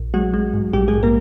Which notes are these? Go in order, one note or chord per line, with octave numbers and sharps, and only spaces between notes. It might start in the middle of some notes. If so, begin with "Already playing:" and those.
Already playing: A#1
F#3 G#3 F#4
G#3
G#2
A#1 G3 G4
G#3 G#4
A#1
A#3 A#4